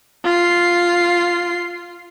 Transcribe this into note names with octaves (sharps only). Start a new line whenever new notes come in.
F4 C7